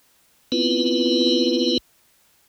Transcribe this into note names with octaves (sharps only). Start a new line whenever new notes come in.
B3 C4 E4 F4 B4